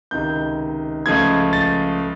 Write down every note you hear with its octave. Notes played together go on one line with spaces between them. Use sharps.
C#2 C3 D#3 G6
C#2 C#3 F3 A3 G#6
A6